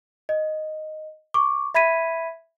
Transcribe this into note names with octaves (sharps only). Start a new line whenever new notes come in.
D#5
C#6 D6
E5 B5 G#6 B6 D#7